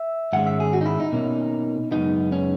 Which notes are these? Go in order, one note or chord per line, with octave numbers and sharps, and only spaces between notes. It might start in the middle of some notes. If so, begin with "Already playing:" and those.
Already playing: E5
G#2 D#3 G#3 C#4 F#5
E5
G#4
F#4
D#4
E4
D#4
B2 A#3 C#4
F#2 C#3 G#3 B3 D#4
C#4